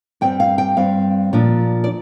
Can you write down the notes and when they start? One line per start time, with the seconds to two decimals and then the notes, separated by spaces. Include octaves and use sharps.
0.21 G2 G3 C4 G5
0.40 F5
0.58 G5
0.77 G2 G3 C4 F5
1.33 A#2 F3 D4
1.84 D5